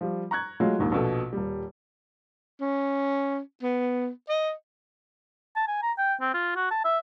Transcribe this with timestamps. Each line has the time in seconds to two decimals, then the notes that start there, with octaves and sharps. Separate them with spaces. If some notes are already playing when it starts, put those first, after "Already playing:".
0.01 F3 G3
0.31 A#5 C#6 F#6 G#6
0.60 F#3 G#3 A3 F4
0.79 A#1 D#2 G#2
0.92 A#1 B2 A4
1.33 D#1 G3
2.61 C#4
3.63 B3
4.29 D#5
5.56 A5
5.68 G#5
5.82 A#5
5.98 G5
6.21 C4
6.34 F4
6.56 F#4
6.71 A5
6.85 E5